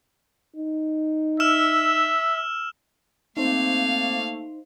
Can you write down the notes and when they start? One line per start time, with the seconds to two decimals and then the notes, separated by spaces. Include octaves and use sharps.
0.56 D#4
1.40 E5 E6 F6 E7
3.37 A3 A#3 C4 D#4 C5 F5